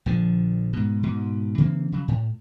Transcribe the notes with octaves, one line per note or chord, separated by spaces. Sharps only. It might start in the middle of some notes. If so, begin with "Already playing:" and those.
A#1 D3 F3
G#2 B2
G#2 B2
C#3 E3 A#3 C4
C#3 F#3
A2